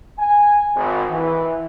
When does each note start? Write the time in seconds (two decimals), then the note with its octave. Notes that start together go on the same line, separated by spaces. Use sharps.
0.18 G#5
0.75 G#1
1.10 E3